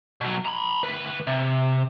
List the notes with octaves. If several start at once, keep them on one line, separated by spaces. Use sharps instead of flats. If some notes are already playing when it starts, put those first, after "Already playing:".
B2 F#3
A#5 B5
D2 B4
C3